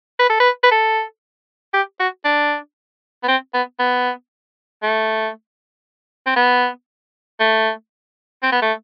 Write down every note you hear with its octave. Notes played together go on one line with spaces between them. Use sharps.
B4
A4
B4
B4
A4
G4
F#4
D4
B3
C4
B3
B3
A3
C4
B3
A3
C4
B3
A3